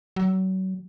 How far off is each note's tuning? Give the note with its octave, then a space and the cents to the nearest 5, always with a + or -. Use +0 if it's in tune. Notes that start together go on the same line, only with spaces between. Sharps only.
F#3 +30